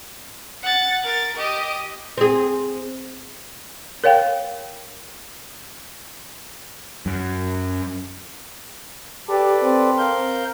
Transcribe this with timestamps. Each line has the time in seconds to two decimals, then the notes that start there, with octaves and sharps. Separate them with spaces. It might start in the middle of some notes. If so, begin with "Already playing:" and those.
0.63 F#5 A6
1.03 A#4 A6
1.36 G4 D#5
2.17 C4 G#4
4.04 A#4 C#5 F5 G5
7.06 F#2
9.29 G4 A4 B4 D5
9.63 C4
9.98 A#4 F5 G6